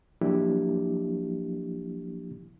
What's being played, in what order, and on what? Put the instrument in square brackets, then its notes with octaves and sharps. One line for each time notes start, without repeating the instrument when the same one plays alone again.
[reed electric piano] F3 F#3 A#3 D4 E4 G4